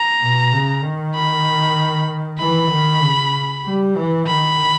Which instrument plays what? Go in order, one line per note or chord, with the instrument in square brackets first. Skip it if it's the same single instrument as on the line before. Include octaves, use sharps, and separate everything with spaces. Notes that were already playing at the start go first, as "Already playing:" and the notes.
Already playing: [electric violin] A#5
[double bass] B2
C#3
D#3
[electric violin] B5
[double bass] E3 [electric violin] B5
[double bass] D#3
C#3
G3
E3
[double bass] D#3 [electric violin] B5